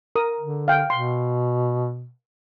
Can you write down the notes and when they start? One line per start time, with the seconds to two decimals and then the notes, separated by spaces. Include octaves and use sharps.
0.16 A#4 D#6
0.40 D3
0.68 F5 G5
0.90 B2 C6